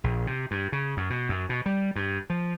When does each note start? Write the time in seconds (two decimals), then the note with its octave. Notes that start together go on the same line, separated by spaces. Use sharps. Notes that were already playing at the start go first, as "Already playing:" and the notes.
0.04 A#1
0.27 C3
0.51 G2
0.72 C#3
0.97 F#2
1.10 B2
1.29 F#2
1.49 B2
1.66 G3
1.96 G2
2.30 F3